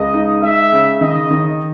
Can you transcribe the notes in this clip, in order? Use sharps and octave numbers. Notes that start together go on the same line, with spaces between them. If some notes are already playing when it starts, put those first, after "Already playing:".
Already playing: C#2 D#5
D#4
G#3 E5
C#3
D#3 D#5
D#3